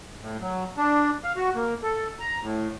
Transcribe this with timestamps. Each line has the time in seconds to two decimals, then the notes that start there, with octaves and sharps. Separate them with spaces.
0.20 A2
0.40 F#3
0.78 D4
1.24 F5
1.36 F#4
1.55 A#3
1.83 A4
2.20 A#5
2.42 A2